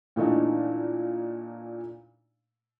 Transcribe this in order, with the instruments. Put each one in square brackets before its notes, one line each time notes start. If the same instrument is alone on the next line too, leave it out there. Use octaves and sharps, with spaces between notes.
[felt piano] A#2 E3 A3 D4 D#4